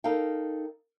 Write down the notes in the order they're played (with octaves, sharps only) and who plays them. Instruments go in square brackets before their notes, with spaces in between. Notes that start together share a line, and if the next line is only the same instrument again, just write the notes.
[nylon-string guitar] D#4 A4 A#4 F5 G5